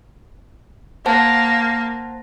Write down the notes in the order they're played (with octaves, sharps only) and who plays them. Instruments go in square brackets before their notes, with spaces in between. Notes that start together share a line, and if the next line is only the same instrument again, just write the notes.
[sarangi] A#3 [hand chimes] C5 F#5 A5